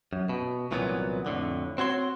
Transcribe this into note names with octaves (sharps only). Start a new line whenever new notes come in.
F#2
B2
C2 A#2 E3 F#3 B3
F2 A2 D3
C4 F#4 C#5 C6